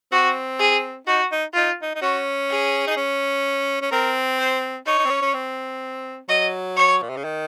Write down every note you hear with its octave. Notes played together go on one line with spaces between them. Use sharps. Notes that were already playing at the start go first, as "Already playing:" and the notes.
C4 F#4
G#4
D#4 F#4
D#4
D#4 F4
D#4
D#4
C#4 F#4
G#4
D#4
C#4
C#4
C4 A#4
C5
D#4 C#5
D#4
C4
C#4
C#4
C4
F#3 D#5
C#5
A#2
C3
C#3
D#3